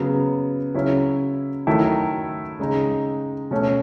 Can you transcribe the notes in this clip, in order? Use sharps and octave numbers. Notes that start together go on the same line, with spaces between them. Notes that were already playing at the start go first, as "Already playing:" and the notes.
Already playing: C#3 F#3 B3
C#3 F#3 C#4 E4
D#3 F#3 A3 E4
C#3 G#3 D#4
B2 A3 C#4